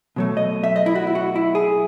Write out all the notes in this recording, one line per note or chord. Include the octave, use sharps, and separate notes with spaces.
B2 F#3 A3
D#5
E5
D#5
E4
F#4
E4
F#4
E4
G#4